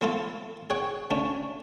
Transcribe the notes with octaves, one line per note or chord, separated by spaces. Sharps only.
F3 A3 B3 E4 F4 A4
G#4 C#5 F#5 G5
D2 A3 C#4 D4